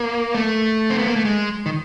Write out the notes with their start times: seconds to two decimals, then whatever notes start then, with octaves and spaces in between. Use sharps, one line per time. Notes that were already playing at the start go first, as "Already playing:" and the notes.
Already playing: A#3
0.35 A3
0.90 C4
0.99 B3
1.07 A#3
1.16 A3
1.25 G#3
1.66 D#3